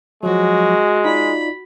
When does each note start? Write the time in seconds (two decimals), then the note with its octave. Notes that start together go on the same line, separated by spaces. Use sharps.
0.23 F3 F#3 G#3 F#4
1.05 D#4 F4 D5 B5